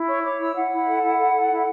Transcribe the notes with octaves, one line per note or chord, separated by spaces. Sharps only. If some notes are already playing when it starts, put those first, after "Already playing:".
Already playing: E4
C#5 C#6
C#5 D6
E4 E6
E4 F#5
E4
A4
E4
A4
A4
E4